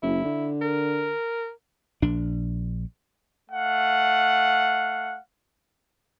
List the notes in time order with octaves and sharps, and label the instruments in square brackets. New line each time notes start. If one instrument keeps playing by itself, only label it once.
[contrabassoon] F#1 [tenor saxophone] E4
[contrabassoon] D3
[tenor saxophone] A#4
[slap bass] A#1 D4
[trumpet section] A3 F5 F#5